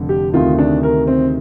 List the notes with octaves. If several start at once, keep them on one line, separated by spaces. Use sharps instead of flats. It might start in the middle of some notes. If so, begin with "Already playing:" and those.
Already playing: F1 F2 D3
G4
D2 C3 D#3 F4
D4
A#4
C4